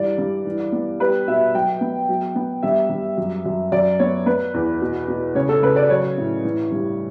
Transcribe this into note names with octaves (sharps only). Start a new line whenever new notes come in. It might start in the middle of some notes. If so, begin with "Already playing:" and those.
Already playing: G2 E3 D5
G2
E3
B3
G3 B4
B2 E5
F#3 G5
B3
F#3
B3
G2 E5
G2
F#2
F#2
F#2 D5
B3 C#5
B3 B4
E2
B2
B2
C#3 C#5
A4
C#3 B4
D5
F#3 C#5
A2
E3
G2